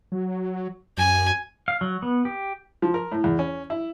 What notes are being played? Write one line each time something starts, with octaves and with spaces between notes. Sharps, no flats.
F#3
F#2 G#5
F5
F#3
B3
G4
F3
A#4
A2
E2
C#4
E4